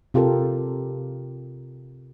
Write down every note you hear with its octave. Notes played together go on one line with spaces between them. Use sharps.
C3 F4 G4 A4 A#4